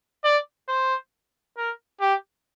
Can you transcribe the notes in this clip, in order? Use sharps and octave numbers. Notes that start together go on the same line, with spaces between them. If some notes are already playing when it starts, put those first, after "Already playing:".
D5
C5
A#4
G4